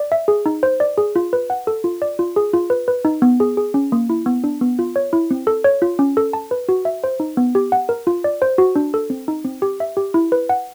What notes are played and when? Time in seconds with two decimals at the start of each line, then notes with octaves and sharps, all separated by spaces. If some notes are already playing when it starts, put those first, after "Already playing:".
Already playing: D5
0.12 E5
0.28 G#4
0.46 D#4
0.63 C5
0.80 D5
0.98 G#4
1.16 F4
1.33 B4
1.50 F#5
1.67 A4
1.84 F4
2.02 D5
2.19 F4
2.36 G#4
2.53 F4
2.70 B4
2.88 B4
3.05 D#4
3.22 B3
3.40 G#4
3.57 G#4
3.74 C#4
3.92 A#3
4.10 E4
4.26 B3
4.44 D4
4.61 B3
4.79 F4
4.96 C#5
5.13 E4
5.31 C4
5.47 A4
5.64 C#5
5.82 F4
5.99 C#4
6.17 A4
6.33 A5
6.51 B4
6.69 F#4
6.85 E5
7.04 C5
7.20 D#4
7.37 B3
7.55 G4
7.72 F#5
7.89 A#4
8.07 F4
8.24 D5
8.42 C5
8.58 F#4
8.76 D4
8.94 A4
9.10 C4
9.28 D#4
9.45 C4
9.62 G4
9.80 E5
9.97 G4
10.14 E4
10.32 B4
10.49 F#5